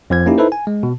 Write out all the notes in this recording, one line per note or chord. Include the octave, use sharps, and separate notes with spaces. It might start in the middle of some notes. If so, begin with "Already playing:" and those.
F2 F3 G#6
A#3 C#4 D#4 E4 G4
D#4 E4 A4 B4 C5
G#5
G#3
B2